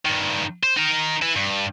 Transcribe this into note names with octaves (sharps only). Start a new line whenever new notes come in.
G2 D#3
C5
D#4 A#4
E4 B4
G2